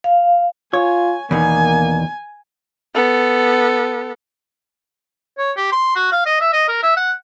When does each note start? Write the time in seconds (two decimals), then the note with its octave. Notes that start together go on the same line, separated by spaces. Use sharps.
0.04 F5
0.73 F4 C#5 G#5
1.31 E2 B2 D#3 A#3 G#5
2.94 B3 A4
5.38 C#5
5.57 G4
5.72 C6
5.96 F#4
6.12 F5
6.26 D#5
6.41 E5
6.53 D#5
6.68 A#4
6.83 E5
6.96 F#5